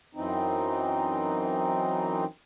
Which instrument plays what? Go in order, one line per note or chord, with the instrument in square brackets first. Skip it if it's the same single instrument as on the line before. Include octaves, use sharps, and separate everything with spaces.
[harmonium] F#2 E3 C4 D#4